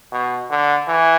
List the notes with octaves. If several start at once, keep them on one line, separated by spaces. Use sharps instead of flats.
B2
D3
E3